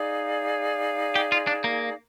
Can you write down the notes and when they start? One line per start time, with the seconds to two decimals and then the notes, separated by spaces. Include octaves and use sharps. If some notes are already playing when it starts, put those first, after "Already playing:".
Already playing: D#4 G#4 D5 F5
1.16 G4
1.32 F4
1.47 D4
1.64 A#3